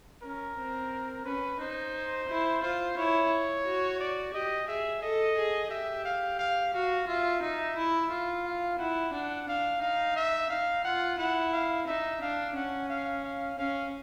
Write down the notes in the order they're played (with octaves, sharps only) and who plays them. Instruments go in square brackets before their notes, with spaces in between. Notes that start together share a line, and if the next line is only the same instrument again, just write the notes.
[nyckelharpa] C#4 [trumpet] A#4
[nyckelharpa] C4
[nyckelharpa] C#4 [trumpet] B4
[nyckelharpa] D#4 [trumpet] C5
[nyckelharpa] E4
[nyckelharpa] F4 [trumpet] C5
[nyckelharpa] E4 [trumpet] C#5
[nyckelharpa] F#4
[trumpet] D5
[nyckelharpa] G4 [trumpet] D#5
[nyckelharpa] G#4 [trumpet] E5
[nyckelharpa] A4 [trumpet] D#5
[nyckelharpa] G#4
[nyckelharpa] G4 [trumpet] E5
[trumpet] F5
F5
[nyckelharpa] F#4 [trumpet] F5
[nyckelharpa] F4 [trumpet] E5
[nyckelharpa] D#4 [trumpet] E5
[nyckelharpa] E4
F4
[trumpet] F5
[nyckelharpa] E4 [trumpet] F#5
[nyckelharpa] D4 [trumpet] F#5
[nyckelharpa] D4 [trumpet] F5
[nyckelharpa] D#4 [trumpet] F5
[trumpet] E5
[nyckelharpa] D#4 [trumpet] F5
[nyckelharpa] F4 [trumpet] F#5
[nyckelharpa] E4 [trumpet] F#5
[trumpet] F5
[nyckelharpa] D#4 [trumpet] E5
[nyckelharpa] D4 [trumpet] F5
[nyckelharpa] C#4 [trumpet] F#5
[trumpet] F5
F5
[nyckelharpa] C#4 [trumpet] F5